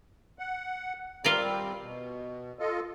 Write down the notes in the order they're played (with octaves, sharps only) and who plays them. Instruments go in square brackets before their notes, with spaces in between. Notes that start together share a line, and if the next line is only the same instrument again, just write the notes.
[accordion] F#5
[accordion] G3 C4 [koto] F4 A#4 D5
[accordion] B2
F4 A4 D#5